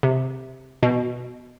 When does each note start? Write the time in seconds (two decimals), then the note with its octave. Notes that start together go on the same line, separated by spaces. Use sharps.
0.03 C3
0.83 B2